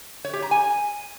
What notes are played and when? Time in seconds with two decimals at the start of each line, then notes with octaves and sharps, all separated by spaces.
0.25 C#5
0.33 G4
0.42 A#5
0.51 G#5